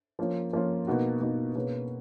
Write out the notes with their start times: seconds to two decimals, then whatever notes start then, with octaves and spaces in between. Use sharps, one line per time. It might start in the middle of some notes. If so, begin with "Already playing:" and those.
0.19 F3 A#3 C#4 F4
0.53 F3 A#3 C#4 F4
0.87 B2 A#3 D#4 F#4
1.21 B2 A#3 D#4 F#4
1.55 B2 A#3 C#4 G#4 B4